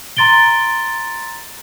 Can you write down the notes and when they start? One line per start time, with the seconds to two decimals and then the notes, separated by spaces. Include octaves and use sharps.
0.17 A#5 C6 A6 D7 G7